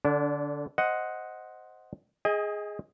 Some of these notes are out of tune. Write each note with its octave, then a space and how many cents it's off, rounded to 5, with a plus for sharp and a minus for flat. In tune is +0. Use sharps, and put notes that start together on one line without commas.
D3 +0 D4 -30
C5 +0 D#5 +10 F#5 +0
G#4 +0 D#5 +20 G#5 -45